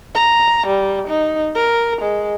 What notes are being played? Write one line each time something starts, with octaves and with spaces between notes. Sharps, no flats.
A#5
G3
D#4
A#4
G#3